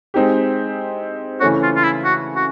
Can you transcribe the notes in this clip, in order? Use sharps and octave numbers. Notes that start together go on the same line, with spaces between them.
G#3 C4 D#4 G4
C#3 E3 A3 C#4 F#4
F4
F4
E4
F#4
F#4